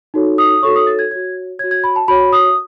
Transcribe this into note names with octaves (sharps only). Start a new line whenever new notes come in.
D#4 F#4 A4 C#5
D#6
D#4 F#4 A4 C#5 C#6
D#6
A6
G#6
F#4 C#5 G#6
F#4 C#5 G#6
G#6
B5
A5
F#4 C#5 B5
D#6